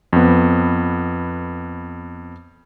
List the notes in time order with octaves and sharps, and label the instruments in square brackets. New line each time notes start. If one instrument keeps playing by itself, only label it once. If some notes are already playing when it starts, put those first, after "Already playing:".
[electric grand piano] F2 B3